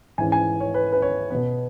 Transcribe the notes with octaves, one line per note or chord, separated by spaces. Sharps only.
G#2 E3 C#4 G#5
G#5
C#5
B4
B4
C#5
B2 B3 B4